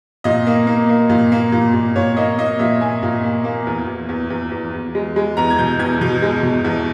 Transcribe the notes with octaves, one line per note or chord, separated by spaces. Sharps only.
A#2 D#5
A#3
A#3
A#3
A#2
A#3
A#2
A#2
A#2 C#5
A#3 D#5
A#3 D#5
A#2 E5
A#3 G#5
A#2
A#3
A#3
E2
E2
E2
E2
E2
E2
G#3
G#3
E2 A#5
G#6
B2 G6
E2 G#6
B2 G6
G#3
B2
E2